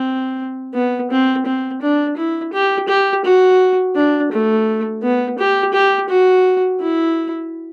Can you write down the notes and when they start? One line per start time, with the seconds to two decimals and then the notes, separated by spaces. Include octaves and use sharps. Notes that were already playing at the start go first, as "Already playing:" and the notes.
Already playing: C4
0.75 B3
1.11 C4
1.46 C4
1.82 D4
2.17 E4
2.53 G4
2.88 G4
3.25 F#4
3.96 D4
4.32 A3
5.03 B3
5.39 G4
5.74 G4
6.09 F#4
6.81 E4